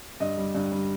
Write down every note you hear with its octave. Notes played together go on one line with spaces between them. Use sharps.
G2 D#5
G3
G2
G3